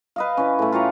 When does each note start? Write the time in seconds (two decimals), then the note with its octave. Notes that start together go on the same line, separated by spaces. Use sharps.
0.16 B4 D#5 F5
0.37 E3 C#4
0.59 A2 A3
0.72 F4 G4 C#5 A#5